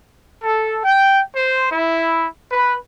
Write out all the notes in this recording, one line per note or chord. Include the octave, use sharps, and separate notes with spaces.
A4
G5
C5
E4
B4